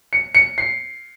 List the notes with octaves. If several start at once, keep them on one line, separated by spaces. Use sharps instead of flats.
C#7
C#7
C7